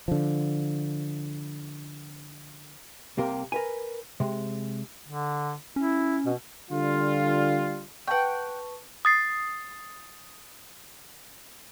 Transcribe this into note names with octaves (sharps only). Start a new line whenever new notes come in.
D3 F3
C2 C3 A#3 G4 A#4
A#4 B4 G#5
C3 G#3
D3
C#4 E4
B2
D3 G3 F4
B4 F#5 G5 A5 C#6
D#6 A6 C7